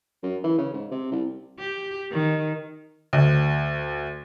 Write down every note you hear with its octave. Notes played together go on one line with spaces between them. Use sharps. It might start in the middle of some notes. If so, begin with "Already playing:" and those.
F#2
E3
C#3
G#2
C3
C2
G4
D#3
D2